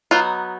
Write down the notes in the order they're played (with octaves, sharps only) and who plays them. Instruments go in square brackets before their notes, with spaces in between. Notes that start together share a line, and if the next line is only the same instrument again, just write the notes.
[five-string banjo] F#3 B3 D#4 F4